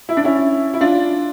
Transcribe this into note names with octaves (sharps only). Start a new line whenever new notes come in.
E4
D4
C#4 E4
E4
D4 F4